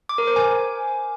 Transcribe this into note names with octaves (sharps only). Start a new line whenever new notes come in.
D6
A#4
C5
G#5